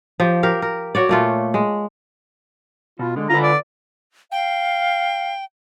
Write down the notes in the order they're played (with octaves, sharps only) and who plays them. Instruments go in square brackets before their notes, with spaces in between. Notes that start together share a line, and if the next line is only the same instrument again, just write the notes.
[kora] F3 G4
G4 A#4 F5
A#4
F#4 C#5 D5
A#2 A3 F4
G#3
[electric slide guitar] B2 [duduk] F4
[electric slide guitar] D3 [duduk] G#3
[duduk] D3 [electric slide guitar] F4 B4 [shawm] A#5
[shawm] D5
[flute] F5 [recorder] G5